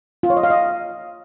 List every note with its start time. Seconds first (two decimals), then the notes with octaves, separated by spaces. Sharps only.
0.23 F4
0.30 C#5
0.37 D#5
0.43 F5
0.50 D#5